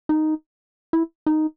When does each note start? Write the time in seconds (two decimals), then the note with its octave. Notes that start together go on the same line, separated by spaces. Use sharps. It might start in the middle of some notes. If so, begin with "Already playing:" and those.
0.09 D#4
0.93 E4
1.26 D#4